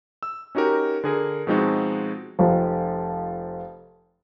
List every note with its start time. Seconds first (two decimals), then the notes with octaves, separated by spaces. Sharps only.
0.23 E6
0.55 C#4 D#4 F#4 G4 A#4
1.04 D3 G#4 A#4
1.47 B2 F3 G#3 C4 D#4 F#4
2.39 F1 F3